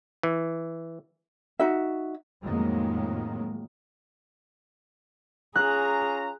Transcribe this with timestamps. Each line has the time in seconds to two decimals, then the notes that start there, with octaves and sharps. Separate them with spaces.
0.23 E3
1.59 D#4 F#4 E5
2.44 F2 A2 D#3 F#3 G#3 A#3
5.56 C#4 F4 G#4 A#5 F#6